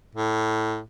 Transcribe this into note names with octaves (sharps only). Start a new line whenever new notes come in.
A2